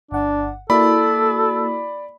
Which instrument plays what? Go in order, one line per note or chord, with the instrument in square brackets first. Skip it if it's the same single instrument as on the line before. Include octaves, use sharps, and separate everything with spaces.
[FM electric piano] G1 F#5 [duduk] D4
[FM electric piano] A#3 E4 F#4 [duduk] A4 [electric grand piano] D5 B5